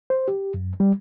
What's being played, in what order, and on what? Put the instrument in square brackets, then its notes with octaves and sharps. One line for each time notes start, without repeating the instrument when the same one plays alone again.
[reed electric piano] C5
G4
F#2
G3